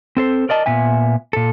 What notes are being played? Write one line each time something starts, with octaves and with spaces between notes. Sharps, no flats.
C4 A4 C5
A#4 D5 D#5 A5
A#2 B3 E5 G#5
A#2 A4